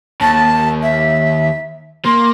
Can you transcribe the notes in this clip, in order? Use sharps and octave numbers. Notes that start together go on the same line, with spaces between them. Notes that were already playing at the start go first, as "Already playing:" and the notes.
D#2 A5
E5
A#3 C6